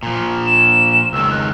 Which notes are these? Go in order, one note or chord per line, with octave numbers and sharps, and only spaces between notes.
A#2 F3
E7
C#2 D#3 E6
F#6